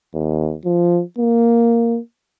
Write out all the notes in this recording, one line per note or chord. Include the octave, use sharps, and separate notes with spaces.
D#2
F3
A#3